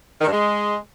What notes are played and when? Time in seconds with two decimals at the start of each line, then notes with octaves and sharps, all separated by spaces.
0.21 D#3
0.26 G2
0.31 G#3